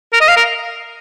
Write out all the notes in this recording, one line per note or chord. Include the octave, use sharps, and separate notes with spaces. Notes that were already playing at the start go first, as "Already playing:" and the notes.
A#4
D#5
F5
A#4